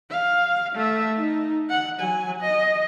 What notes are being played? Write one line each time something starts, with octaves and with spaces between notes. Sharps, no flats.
F5
A3 E5
D#4
F#5
F#3 G#5
D#5